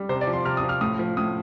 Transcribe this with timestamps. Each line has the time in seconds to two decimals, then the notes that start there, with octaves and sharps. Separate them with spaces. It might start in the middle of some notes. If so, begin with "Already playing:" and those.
Already playing: G3
0.09 C3 C5
0.21 D5
0.27 F3
0.33 C6
0.45 C3 F6
0.57 D#6
0.63 F3
0.69 F6
0.81 A2 D#6
0.99 F3
1.17 A2 D#6